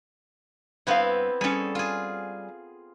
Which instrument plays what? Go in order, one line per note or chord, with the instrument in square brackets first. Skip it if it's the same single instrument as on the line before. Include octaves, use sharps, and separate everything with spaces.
[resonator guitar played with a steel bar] G2 F5 [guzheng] B3 C4 E4
[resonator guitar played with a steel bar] G3 C#4 [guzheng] G#4 A4
[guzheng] F4 G#4